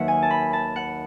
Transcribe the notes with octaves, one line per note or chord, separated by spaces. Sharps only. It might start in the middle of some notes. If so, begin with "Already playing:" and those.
Already playing: D#2 D#3 F#3 B4 E5 F#5
G#5
A5
B5
A5
F#5